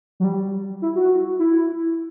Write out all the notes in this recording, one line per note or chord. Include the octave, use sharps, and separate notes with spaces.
F#3
G3
E4
F#4
E4